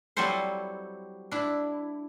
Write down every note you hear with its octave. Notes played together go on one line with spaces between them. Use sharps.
F#3 G3 C4 E4 A4 C5
D4 E4